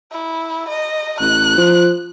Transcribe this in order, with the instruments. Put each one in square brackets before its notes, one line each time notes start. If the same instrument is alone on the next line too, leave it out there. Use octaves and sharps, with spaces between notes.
[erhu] E4
D#5
[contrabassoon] A1 [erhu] F#6
[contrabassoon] F3